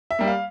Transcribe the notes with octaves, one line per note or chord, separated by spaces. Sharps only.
E5
G3 A#3
F5